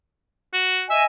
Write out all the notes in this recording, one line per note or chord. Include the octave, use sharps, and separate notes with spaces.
F#4
D#5 E5 G#5